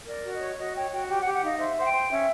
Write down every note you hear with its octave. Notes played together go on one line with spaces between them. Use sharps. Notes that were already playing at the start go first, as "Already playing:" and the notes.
A#4 D5
F#4
D#5
C#5
F#4 D#5
C#5 G5
F#4 G5
G4 G5
F#5
G4
F#5
D#4 F5
C5 E5
C5 F#5
G5
C5
C#4 E5